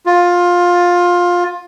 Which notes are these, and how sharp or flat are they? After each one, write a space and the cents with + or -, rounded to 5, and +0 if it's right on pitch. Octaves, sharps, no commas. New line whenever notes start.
F4 +15